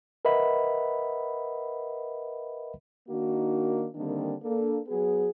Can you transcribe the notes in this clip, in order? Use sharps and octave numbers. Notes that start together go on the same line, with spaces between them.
A#4 B4 D#5 E5 F#5 B5
D#3 A#3 D4 D#4 F#4
D3 D#3 G3 A#3 C4 D4
A#3 D4 A4
F#3 B3 F#4 G#4